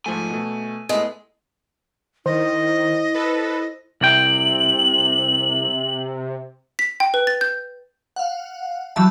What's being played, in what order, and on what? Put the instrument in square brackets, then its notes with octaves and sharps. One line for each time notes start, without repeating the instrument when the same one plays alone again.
[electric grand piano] G#2 F3 A3 [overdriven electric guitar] G#5
[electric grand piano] B2 A3
[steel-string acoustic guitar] G#3 [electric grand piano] A3 B3 E4
[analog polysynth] D#3 [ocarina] E4 [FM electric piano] C5 [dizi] D#5
[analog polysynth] A4 B4
[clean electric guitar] C2 G5 [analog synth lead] C3 [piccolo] F#7
[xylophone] B6
G5
B4
A6
G6
[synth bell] F5 F#5
E3 F#3 G3 E5 A5